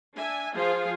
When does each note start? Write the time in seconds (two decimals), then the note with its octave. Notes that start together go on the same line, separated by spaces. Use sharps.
0.16 D4 E5 G#5
0.55 F3 F4 G#4 C5